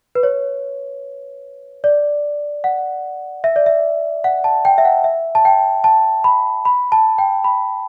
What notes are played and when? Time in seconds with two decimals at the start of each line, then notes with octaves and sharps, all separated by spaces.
0.15 B4
0.23 C#5
1.84 D5
2.64 F#5
3.44 E5
3.56 D5
3.66 E5
4.24 F#5
4.44 A5
4.65 G5
4.78 E5
4.85 F#5
5.04 E5
5.35 A5
5.45 G5
5.84 A5
6.24 B5
6.65 B5
6.92 A5
7.18 G5
7.44 B5